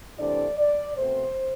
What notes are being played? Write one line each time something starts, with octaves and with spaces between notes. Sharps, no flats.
C3 E3 A3 D4 D5
D5
B2 A3 C4 C5